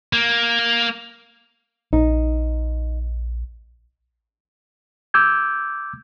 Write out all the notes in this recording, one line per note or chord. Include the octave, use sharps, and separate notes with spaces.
A#3
A#1 D#4
D6 E6 G6 G#6